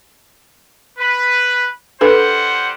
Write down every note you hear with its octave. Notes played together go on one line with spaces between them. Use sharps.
B4
G3 D4 A4 B4 C5 F#5